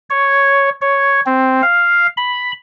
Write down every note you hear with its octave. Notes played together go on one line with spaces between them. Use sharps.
C#5
C#5
C4
F5
B5